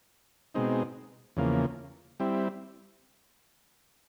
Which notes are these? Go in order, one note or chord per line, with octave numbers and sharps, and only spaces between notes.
B2 G#3 C4 D#4
E2 C#3 F3 A#3
G3 C4 E4